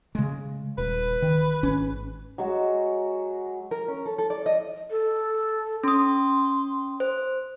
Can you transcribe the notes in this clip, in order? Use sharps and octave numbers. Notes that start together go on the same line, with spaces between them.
C#3 G#3
D#1 B4
D#3
G#1 C#4
F#3 G#3 F#4
A#4
C#4
A4
A4
D5
D#5
A4
C#4 C6 D#6
C5